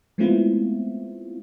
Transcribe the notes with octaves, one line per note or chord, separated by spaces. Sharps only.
G#3 A3 B3 C4 E4 F4